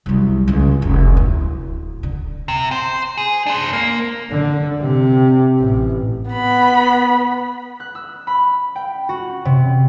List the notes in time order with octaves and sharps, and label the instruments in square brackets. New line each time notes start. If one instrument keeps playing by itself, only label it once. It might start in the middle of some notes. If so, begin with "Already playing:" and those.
[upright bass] C2 F#3
C#2 D#3
F1
D1
D3
[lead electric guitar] C3
C5
G#4
D4 C5
A#3
[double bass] D3
C3
A1
[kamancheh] B3 B5
[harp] F#6
E6
B5
G5
F#4
C3